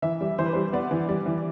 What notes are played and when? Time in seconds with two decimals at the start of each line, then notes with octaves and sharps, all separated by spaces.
0.02 E3 E5
0.21 G3
0.38 E3 C5
0.46 B4
0.53 G3 C5
0.73 B3 D5
0.91 E3
1.09 G3 D5
1.26 E3